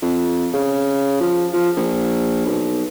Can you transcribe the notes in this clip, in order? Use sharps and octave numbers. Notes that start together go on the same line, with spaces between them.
F2
C#3
F3
F3
A#1
B1